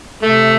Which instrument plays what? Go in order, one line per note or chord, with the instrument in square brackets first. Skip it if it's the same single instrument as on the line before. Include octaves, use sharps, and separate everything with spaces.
[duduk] C3 [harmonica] A3